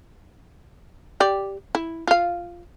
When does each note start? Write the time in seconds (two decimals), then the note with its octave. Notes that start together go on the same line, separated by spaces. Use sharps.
1.20 G4 D5
1.75 E4
2.08 F4 F5